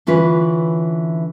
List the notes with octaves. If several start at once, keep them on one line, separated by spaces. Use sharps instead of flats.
D3 E3 C#4 F4 B4